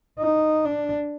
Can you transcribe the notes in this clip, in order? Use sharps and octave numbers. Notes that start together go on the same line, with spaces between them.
D#4
D4